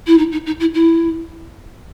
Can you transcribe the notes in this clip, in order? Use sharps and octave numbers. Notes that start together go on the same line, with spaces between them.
E4
D#4
D#4
D#4
E4
E4